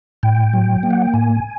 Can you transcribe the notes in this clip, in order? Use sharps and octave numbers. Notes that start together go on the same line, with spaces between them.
A2 G5
F#3
A#3
F#5
G5
A2 G#5